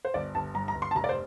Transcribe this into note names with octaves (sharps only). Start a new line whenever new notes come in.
C5
G1 D5
G1 A5
G2 A#5
A#5
G1
C6
A5
F1 A#5
D5
C5